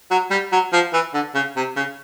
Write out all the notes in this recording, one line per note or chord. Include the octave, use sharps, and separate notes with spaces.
F#3
G3
F#3
F3
E3
D3
C#3
C3
C#3